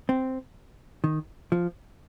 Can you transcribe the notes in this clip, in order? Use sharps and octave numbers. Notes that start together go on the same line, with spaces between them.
C4
D#3
F3